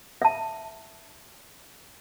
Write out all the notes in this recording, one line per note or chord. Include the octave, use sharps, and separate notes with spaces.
E5 A5